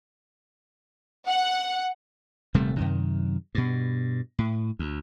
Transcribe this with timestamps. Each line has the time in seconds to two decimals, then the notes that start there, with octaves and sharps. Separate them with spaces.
1.27 F#5
2.54 D#1 C3 G3 A3
2.77 F#2 C3 D#3
3.55 G2 B2
4.39 A2
4.79 D2